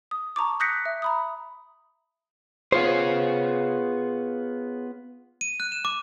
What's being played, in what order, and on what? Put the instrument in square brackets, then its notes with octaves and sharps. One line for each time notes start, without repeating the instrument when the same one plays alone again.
[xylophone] D#6
A5 A#5 C#6 D6
D#6 F#6 G6 A#6 B6 C#7
E5
A#5 B5 D#6
[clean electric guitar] B3 F4 C5 [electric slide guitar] G#4 C#5 F5
[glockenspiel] D#7
F#6
E7
D6